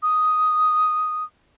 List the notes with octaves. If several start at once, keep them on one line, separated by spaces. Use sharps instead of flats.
D#6